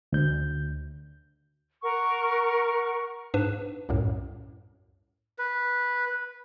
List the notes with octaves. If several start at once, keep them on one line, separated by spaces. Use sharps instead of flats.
D2 G6
A#4 F#5 C#6
G#2 D4 B4 E7
C2 F#2 A2
B4